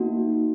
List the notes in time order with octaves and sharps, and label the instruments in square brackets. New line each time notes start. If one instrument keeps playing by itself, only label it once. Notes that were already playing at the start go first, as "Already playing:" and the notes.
Already playing: [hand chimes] A#3 D#4 F#4